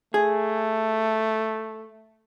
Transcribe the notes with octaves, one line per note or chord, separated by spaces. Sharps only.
A3 G#4